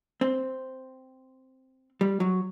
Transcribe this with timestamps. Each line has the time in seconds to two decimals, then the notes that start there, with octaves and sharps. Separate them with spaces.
0.21 C4
2.01 G3
2.20 F#3